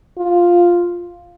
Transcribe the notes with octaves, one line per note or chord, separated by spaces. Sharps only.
F4